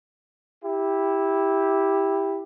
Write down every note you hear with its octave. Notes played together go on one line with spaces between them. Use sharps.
E4 G4